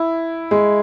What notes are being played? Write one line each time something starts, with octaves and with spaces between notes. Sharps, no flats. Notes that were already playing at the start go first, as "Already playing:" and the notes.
Already playing: E4
G#3